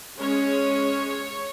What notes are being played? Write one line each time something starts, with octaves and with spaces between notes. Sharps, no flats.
G#3 C#4 C#5